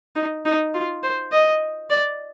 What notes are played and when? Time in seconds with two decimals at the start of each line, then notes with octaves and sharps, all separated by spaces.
0.16 D#4
0.45 D#4
0.74 F4
1.03 C5
1.32 D#5
1.90 D5